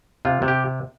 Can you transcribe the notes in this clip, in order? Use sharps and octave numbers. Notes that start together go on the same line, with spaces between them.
C3 F4
C3
G4